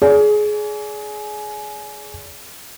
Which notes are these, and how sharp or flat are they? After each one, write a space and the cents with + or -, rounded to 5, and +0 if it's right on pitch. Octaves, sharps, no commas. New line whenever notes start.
G#4 +20 D5 -40